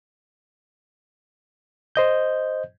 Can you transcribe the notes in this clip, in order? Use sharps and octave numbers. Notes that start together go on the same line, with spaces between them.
C5 D#5 G6